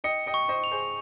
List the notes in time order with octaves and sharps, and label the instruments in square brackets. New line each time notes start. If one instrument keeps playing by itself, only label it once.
[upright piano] D#5 G5 [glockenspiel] C#7
[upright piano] D#5 G5
[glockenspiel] C#6
[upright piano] C5 D#5
[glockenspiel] F7
[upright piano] G#4 C5